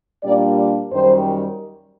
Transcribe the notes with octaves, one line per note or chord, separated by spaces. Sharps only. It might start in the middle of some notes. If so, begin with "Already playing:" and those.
A#2 G3 A#3 D4 D5
D5
F#2 D#3 G3 C5